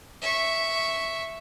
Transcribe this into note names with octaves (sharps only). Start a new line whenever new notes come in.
E5 C#6